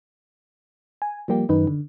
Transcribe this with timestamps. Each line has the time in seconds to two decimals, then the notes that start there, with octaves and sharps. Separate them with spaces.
1.02 G#5
1.28 F3 G3 A#3 G4
1.49 F#2 D#3 D#4 B4
1.67 D3